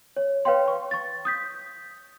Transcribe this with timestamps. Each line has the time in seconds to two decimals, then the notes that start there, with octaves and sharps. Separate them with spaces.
0.16 C#5
0.45 B4 C#5 F5 G5 C6
0.68 C#6
0.91 C#6 A6
1.25 D#6 G6 B6